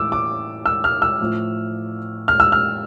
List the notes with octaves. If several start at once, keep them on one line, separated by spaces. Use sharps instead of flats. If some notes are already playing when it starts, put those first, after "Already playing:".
Already playing: A2 E3 D6 E6
D6
E6
F6
E6
A2 F3
F6
E6
F6